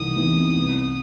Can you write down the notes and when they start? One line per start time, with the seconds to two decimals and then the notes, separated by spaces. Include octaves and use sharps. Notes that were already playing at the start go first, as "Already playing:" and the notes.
Already playing: C2 C3 E3 D#4 D#6
0.16 C3 E3 B3 D#4
0.56 C2